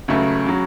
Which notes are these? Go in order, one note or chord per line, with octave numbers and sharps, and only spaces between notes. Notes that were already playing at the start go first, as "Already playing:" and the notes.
C#2 C#3 F#3 A3
C#3 F#3